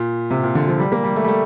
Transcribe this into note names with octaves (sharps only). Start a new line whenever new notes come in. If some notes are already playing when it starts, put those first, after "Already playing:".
Already playing: A#2
C3
A#2
D3
F3
G3
A#3
G3
A3
G3
A3